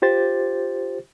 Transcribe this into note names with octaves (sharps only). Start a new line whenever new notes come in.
F4 G4 C5 A6